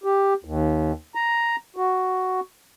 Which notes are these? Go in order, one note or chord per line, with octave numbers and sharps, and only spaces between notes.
G4
D#2
A#5
F#4